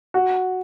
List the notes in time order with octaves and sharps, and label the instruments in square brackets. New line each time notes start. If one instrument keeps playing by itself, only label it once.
[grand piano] F#4